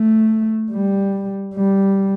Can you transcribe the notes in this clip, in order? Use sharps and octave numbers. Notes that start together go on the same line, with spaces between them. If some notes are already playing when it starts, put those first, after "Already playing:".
Already playing: A3
G3
G3